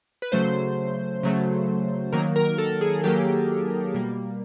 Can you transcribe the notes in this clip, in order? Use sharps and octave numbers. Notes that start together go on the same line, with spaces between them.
B4
C#3 F#3 A3 C5
C#3 F#3 A3
D#3 F#3 A#3 A#4
A#4
A4
G#4
D#3 F#3 A#3 G4
B2 G3 A#3